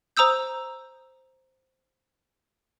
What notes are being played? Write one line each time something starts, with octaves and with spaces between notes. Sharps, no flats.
C5 A#5 D#6 E6 G6